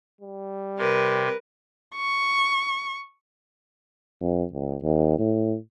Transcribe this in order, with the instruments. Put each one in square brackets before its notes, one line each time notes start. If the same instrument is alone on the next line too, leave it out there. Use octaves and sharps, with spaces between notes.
[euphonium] G3
[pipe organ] C3 [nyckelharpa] A#4 B4
[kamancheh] C#6
[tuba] F2
C#2
D#2
A2